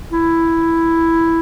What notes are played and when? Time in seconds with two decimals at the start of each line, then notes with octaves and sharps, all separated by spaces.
0.12 E4